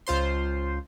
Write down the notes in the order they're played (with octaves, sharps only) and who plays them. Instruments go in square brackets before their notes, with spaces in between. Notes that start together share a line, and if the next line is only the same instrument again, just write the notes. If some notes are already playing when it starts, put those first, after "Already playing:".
[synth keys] C#2 F4 C5 C6